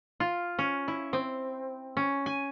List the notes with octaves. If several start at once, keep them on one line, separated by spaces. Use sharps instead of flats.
F4
C#4
E4
C4
C#4
G#5